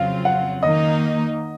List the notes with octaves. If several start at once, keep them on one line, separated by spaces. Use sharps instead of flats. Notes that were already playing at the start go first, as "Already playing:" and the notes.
Already playing: F2 C#3 F#3 C4 F4 F5
F#5
D#3 A#3 D#4 D#5